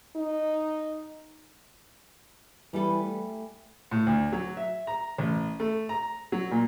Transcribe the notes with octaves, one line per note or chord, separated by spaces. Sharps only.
D#4
E3 G3 B3 G4 A4 G#5 B5
A3
A2
D2
F#3
E5
A#5
A1
A3
A#5
F#3
A#2